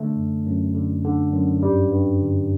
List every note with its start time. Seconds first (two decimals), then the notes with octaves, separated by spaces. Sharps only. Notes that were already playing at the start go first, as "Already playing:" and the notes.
Already playing: D3 A3
0.16 F#2
0.46 F#2
0.74 D3
1.04 D3
1.32 F#2
1.63 G2 G3
1.92 G2
2.21 D3